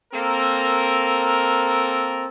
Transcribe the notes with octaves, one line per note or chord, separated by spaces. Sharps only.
A#3 C4 A4 A#4